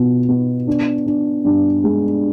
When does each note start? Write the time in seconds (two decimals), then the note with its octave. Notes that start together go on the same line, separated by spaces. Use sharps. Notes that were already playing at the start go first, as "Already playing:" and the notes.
Already playing: B2 B3 F4
0.29 B3
0.67 D4
1.06 D4
1.45 G2
1.84 G#3